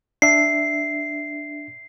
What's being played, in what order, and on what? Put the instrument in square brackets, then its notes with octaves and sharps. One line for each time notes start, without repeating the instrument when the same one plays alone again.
[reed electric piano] D4 E5 [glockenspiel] C7